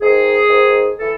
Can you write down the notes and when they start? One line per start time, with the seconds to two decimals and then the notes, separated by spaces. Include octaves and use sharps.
0.01 G#2 D#3 G#4
0.48 G#2 D#3
0.96 E3 A4